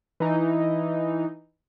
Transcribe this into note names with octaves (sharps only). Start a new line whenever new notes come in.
E3 D#4